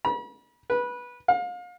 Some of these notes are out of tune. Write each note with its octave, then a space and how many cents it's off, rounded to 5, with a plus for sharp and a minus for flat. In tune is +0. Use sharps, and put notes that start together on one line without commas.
B5 -40
B4 -15
F5 +35